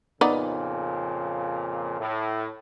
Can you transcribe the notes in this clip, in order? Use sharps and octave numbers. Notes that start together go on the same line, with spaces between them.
F2 A#2 C#3 B3 D#4 D5
A2